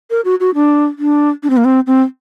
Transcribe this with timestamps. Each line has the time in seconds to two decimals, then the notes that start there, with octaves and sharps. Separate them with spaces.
0.10 A#4
0.25 F#4
0.40 F#4
0.55 D4
0.98 D4
1.43 D4
1.50 C4
1.57 A#3
1.65 C4
1.87 C4